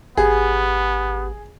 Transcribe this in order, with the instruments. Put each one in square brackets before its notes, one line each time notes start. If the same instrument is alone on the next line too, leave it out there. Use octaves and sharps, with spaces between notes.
[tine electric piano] G#1 G4 [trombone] B3 [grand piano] G#4